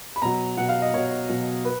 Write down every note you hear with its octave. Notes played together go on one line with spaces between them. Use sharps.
B5
B2 F#3 A#5
B2 F#3 F#5
F5
D#5
B2 F#3 C#5
B2 F#3
B4